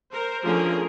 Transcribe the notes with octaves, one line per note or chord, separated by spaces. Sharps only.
A#4 C5
D3 F3 A3 C#4 G#4 A#4